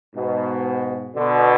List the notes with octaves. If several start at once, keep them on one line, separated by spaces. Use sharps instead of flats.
G#2 B2
B2 D3